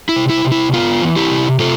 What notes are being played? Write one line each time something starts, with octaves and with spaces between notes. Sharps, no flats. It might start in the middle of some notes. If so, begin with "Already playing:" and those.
E4
C3
E4
C3
E4
B3 F4
E3
E4 G4
C3
C3 F4 A4